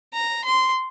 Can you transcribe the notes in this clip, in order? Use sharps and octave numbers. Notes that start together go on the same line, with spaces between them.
A#5
C6